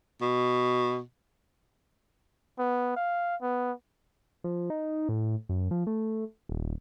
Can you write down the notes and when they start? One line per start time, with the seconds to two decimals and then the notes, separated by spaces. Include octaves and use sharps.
0.21 B2
2.58 B3
2.96 F5
3.41 B3
4.44 F3
4.70 D#4
5.09 A2
5.49 F#2
5.71 F3
5.87 A3
6.49 D#1